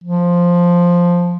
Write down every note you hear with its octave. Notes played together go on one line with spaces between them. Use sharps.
F3